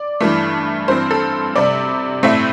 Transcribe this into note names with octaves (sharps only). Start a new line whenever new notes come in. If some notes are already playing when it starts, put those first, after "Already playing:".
Already playing: D5
G2 E3 A3
G2 E3 C4 C5
A4
C3 G3 C4 D5
A2 A3 C4 E5